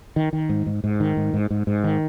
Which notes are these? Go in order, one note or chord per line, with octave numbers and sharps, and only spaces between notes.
D#3
D#3
G#2
G#2
G#2
D#3
G#2
G#2
G#2
G#2
D#3